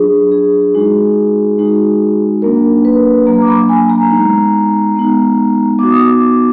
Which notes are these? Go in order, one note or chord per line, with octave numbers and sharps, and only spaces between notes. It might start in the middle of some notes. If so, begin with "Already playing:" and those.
Already playing: F#3 D4 F4 G#4
G#4
G#3 D#4 F#4
G#3 D#4 F#4
F#3 A#3 D4 A#4
B4
F#3 A#3 D4 A#5
D6
B5
G#5
A#5
G#3 B3 D#4
G#3 B3 D#4
B3 D#4 F#4 D6
D#6
D6